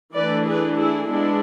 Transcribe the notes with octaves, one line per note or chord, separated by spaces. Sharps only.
E3 A3 D4 B4 D5
G#4 B4
E4 G#4
G#3 B3 D4 E4